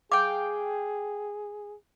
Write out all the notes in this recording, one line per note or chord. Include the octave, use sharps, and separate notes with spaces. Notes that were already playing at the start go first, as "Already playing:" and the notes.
G#4 F5 G5 D6